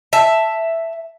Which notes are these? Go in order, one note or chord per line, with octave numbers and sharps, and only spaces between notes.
E5 A5